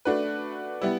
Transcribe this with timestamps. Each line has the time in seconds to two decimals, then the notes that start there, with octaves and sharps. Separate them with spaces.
0.05 A3 D4 F#4 B4
0.82 G3 B3 E4